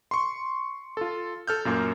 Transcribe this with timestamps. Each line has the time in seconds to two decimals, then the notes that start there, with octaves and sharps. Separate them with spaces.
0.11 C6 C#6
0.97 F4 A4
1.47 A4 F6 G6
1.65 F#2 A#2 A#3